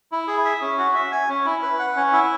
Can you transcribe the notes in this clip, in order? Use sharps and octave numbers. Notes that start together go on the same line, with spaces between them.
E4
G#4
E5
C#4
F#4
E5
G#5
C#4
E4
B4
F#5
C#4
E4